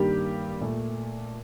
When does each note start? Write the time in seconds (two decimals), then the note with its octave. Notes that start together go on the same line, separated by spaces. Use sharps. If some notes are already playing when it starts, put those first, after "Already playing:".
Already playing: G2 D#3 G3 A#3 G4
0.61 A#2 A3